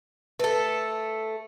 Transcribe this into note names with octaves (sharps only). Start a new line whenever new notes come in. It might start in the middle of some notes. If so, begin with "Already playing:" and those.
A3 A4 B4